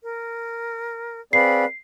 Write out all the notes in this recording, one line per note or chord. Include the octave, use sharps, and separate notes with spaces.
A#4
C4 G#4 B4 D5 F5 B5 C7